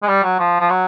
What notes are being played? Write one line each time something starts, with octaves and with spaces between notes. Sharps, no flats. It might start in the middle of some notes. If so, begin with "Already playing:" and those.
G#3
G3
F#3
F3
F3
F#3